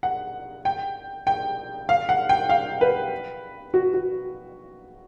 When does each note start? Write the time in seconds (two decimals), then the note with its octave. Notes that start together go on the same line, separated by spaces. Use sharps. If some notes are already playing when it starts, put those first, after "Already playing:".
0.03 F#5
0.65 G5
1.27 G5
1.89 F5
2.09 F#5
2.29 G5
2.49 F5
2.81 B4
3.74 F#4
3.94 F#4